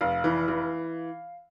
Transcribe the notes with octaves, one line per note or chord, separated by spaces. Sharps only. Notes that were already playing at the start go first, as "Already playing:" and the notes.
F1 F5
E3
E3